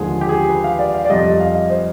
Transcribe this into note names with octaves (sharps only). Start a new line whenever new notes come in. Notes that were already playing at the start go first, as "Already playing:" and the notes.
Already playing: D#2 D3 F3 G#3 G#4
G4
G#4
B4
F5
D5
F5
D5
F2 C3 G3 D#5
D#5
F5
D#5
C5